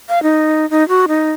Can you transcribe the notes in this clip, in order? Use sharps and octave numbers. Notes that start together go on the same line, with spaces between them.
F5
D#4
D#4
F#4
D#4